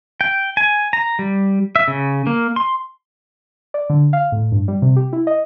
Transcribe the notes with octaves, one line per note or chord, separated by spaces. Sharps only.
G5
G#5
A#5
G3
E5
C#3
A#3
C6
D5
D3
F5
A2
G2
G3
C3
G4
E4
D#5